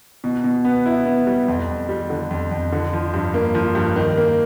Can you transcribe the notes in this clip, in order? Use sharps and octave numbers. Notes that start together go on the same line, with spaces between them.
B2
B2
B3
E4
B3
G3
F2
F2
G3
D3
F2
F2
D3
F3
G2
A#3
F3
G2
D#3
A#3